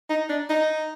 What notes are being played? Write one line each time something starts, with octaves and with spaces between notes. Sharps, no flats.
D#4
D4
D#4